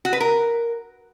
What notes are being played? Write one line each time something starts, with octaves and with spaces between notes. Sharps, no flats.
F#4
B4
A#4